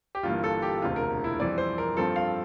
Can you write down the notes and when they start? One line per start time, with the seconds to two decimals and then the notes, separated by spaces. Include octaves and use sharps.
0.15 G4
0.23 G1 G2 E3 A#3 F4
0.44 A4
0.62 G4
0.82 E1 D2 C3 F4
0.96 A#4
1.24 E4
1.39 F2 E3 G3 C4 D5
1.58 C5
1.78 A#4
1.97 G2 F3 C4 A4
2.16 F5